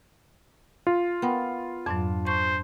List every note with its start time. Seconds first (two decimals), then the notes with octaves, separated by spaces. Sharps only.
0.87 F4
1.22 B3 A#4 F#5 G5
1.86 F2 G#2 F#3 D4
2.26 C5 A5 C#6